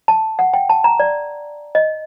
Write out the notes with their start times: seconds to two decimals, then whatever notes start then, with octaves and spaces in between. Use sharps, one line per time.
0.08 A5
0.39 F#5
0.54 G5
0.70 A5
0.84 A#5
1.00 D5
1.75 D#5